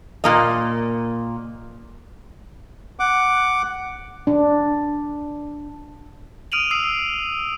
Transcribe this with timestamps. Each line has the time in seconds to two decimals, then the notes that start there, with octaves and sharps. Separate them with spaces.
0.24 A#2 A#3 D#5
2.99 F#5 D6
4.27 D4
6.52 D#6 F6 D7 D#7 F7 F#7
6.71 D#6 E6 C7